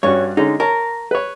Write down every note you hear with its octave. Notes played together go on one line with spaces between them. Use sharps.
G2 C#4 F#4 C#5
D3 G#3 C#4 D#4
A#4 C#5 A5
B4 C#5